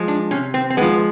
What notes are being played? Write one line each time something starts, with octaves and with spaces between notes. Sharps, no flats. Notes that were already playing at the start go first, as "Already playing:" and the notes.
Already playing: F3 G#3
D4
C3 C#4
C4
C4
F3 G#3 B3